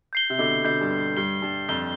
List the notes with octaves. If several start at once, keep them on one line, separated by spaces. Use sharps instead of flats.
G6 C7 G7
C3
B2 D3
B2 D3 G6 C7 G7
G2
G2 G6 C7 G7
G2
F2 G6 C7 G7